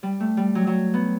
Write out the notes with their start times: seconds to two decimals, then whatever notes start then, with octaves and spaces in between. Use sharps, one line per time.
0.03 G3
0.20 A3
0.37 G3
0.55 F#3
0.67 F#3
0.94 B3